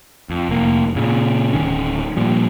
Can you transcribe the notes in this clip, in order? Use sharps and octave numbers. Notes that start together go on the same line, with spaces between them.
F2
F1 A#3
A#2 C#3
D1 C#2 D#3 C#4
A#2 F3 G3